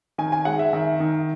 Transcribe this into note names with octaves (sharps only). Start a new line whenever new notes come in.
D#3 G#5
G#5
G#3 F#5
E5
D#3 E5
D#3